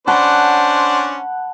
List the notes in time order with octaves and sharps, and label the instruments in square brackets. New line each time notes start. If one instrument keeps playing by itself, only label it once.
[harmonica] C#4 D4 C5 [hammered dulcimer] F#5 A5 B5